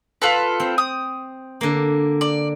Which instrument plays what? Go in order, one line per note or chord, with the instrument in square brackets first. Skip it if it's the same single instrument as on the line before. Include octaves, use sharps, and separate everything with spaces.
[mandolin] F4 A4 B4
[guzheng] C4
[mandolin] D#6
[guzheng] D3 A#3
[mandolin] D5